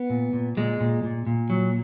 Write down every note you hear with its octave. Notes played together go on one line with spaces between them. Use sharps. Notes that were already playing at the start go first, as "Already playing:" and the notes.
Already playing: B3
A#2
A#2
A#2 G#3
A#2
A#2
A#2
F#3